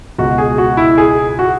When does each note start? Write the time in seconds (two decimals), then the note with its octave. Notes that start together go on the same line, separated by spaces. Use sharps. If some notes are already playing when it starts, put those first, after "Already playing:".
0.18 C#2 B2 F#4
0.38 G#4
0.58 F#4
0.77 E4
0.98 G#4
1.39 F#4